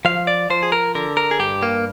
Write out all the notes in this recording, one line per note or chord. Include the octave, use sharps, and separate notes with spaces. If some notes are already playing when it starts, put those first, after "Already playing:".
F3 F5
D5
F3 C5
G#4
A#4
D3 A#4
A#4
G#4
G2 G4
A#3